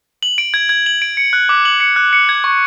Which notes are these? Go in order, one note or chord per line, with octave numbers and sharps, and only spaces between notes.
F#7
D7
G#6
G#6
F#7
D7
C#7
F#6
D6
F#7
C#7
F#6
C#7
G#6
C#6